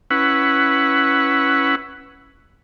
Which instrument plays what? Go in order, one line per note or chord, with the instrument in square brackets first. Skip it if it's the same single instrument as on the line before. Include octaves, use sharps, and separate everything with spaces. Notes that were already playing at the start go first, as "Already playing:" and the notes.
[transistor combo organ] C#4 E4 B4 F#5